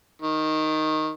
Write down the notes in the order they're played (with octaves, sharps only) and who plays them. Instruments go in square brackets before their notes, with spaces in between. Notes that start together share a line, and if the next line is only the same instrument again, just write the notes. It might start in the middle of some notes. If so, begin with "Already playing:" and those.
[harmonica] D#3